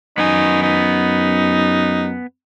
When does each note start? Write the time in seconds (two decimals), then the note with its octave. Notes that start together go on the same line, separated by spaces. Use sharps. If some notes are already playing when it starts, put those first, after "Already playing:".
0.18 F#2 B3 D#4 G#5
0.63 D#4